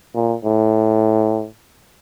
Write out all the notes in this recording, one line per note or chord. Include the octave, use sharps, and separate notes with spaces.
A#2
A2